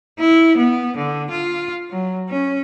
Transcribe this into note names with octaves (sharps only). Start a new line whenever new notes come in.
E4
B3
D3
F4
F#3
C#4